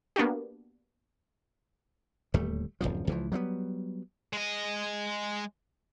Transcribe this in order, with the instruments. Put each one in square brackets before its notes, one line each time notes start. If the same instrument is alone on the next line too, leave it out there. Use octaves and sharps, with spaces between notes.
[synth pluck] A#3 B3 D4 F#4 G4
[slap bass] D1 D#2 G3 A3
D1 B1 F#2 F3
C#2 E3 F3
F#3 G3 A3 B3
[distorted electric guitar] G#3 D#5